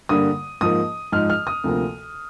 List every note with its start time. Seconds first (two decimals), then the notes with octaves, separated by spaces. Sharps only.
0.09 G2 D3 G3 A#3 D#6
0.61 G#2 F3 A#3 D#6
1.12 G#2 F3 G#3 F6
1.30 F6
1.47 D#6
1.64 D2 C3 F3 A#3